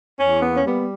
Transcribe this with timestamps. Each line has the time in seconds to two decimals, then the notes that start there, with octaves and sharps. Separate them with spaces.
0.20 E2 C#4
0.42 A#3 B3
0.56 C#4
0.65 G3 B3